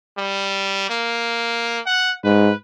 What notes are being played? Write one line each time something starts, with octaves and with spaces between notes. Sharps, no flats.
G3
A#3
F#5
G#2 B4